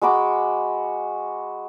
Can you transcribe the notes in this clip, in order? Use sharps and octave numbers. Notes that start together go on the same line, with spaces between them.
G#3 F#4 B5 D6